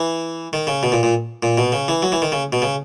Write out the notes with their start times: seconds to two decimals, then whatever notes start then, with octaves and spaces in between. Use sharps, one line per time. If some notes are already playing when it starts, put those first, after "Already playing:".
Already playing: E3
0.53 D#3
0.67 C#3
0.83 B2
0.92 A#2
1.03 A#2
1.43 A#2
1.58 B2
1.72 C#3
1.88 E3
2.02 F#3
2.12 E3
2.22 D#3
2.32 C#3
2.53 B2
2.62 C#3